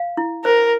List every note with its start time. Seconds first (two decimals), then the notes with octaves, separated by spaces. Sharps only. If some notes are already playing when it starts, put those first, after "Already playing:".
Already playing: F5
0.17 E4
0.44 A#4 C5